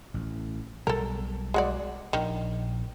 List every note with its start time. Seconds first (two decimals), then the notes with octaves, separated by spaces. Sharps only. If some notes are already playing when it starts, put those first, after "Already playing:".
0.14 A1
0.87 B1 B2 G3 A4 A#4
1.54 G#3 F#4 D5
2.13 A#1 D#3 D4